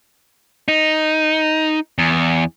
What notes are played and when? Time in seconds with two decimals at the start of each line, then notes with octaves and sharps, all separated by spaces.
0.68 D#4
1.98 E2